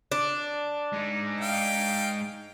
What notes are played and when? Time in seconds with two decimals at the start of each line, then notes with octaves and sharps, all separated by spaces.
0.12 D4
0.93 G#3 D#4
1.41 F5 G5